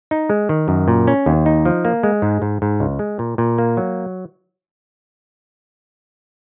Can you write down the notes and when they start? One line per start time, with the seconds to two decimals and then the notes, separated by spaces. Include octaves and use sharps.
0.11 D#4
0.30 G#3
0.49 D#3
0.68 F#2
0.88 A#2
1.07 C#4
1.26 D#2
1.46 D#4
1.65 F3
1.85 A#3
2.03 G#3
2.22 G#2
2.42 G#2
2.62 G#2
2.80 C#2
2.99 G#3
3.19 A#2
3.38 A#2
3.58 A#3
3.77 F#3